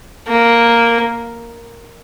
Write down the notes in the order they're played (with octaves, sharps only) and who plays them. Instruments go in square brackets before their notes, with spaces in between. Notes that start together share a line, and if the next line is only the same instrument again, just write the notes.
[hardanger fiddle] A#3